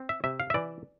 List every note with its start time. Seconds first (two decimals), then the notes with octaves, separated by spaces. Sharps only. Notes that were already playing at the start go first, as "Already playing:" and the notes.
Already playing: C4
0.09 E5
0.24 C3 E5
0.40 F5
0.50 E5
0.54 E3 D5